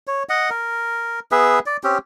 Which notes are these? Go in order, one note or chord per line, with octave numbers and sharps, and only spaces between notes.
C#5
D#5 F#5
A#4
B3 G#4 B4 E5
D5
C4 C#4 G4